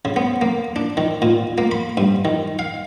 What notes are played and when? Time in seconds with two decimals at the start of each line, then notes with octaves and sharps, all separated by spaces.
0.05 C#3
0.16 B3
0.41 A#3
0.76 D4
0.97 D#3
1.22 A#2
1.58 A#3
1.71 B5
1.97 G2
2.25 D#3
2.59 F5